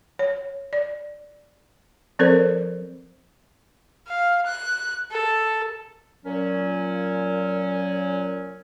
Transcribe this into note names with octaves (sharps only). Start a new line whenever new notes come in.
C#5
D5
F3 C4 A4 A#4 C5 D5
F5
F#6
A4
A#2 F#3 C#4